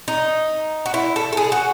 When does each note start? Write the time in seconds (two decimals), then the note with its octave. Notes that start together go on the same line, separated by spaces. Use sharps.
0.08 D#4
0.86 F#4
0.94 E4
1.16 A4
1.33 A4
1.37 G#4
1.52 F#4